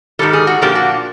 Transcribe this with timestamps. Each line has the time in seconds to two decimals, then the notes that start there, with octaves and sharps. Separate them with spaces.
0.19 G#2 D#3 G3 A4
0.33 G#4
0.47 F#4
0.62 A#2 F3 A#3 D4 G4
0.75 F#4